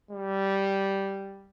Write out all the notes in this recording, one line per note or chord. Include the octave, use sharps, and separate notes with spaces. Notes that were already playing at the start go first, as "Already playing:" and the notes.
G3